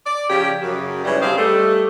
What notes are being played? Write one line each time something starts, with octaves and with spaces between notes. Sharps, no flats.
D5
C#3 F3 G4
F#2 C#3
G#2 C#3 E3 G3
D3 G3 C4 C5 D#5 F5
G3 A3